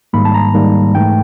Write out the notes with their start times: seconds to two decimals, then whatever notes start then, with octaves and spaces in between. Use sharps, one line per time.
0.13 G#2 D#3 G3 A#3 B5
0.25 A5
0.34 A#5
0.54 G#2 D#3 G3 A#3
0.95 G#2 E3 A3 G5